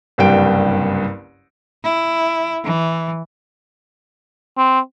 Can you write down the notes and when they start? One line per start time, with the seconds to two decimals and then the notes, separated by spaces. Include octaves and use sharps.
0.18 F#1 C2 G2 G3 G5 D7
1.84 E4
2.64 E3
4.57 C4